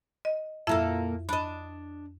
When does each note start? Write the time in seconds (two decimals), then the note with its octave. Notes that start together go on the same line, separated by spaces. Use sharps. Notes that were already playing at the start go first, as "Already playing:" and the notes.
0.25 D#5
0.67 F2 A#2 A#3 E4 A4 E5
1.29 D4 D#5 B5